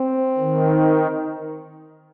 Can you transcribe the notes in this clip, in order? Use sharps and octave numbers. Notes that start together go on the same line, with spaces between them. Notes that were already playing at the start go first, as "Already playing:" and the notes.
Already playing: C4
D#3